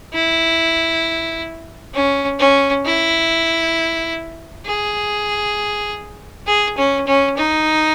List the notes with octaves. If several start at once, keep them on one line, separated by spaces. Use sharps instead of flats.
E4
C#4
C#4
E4
G#4
G#4
C#4
C#4
D#4